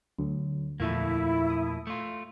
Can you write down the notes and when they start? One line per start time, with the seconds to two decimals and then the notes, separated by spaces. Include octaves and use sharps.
0.19 D2 F#3
0.80 E2 A#2 F3 A3 A#3 E4
1.50 D#6
1.87 A3 F4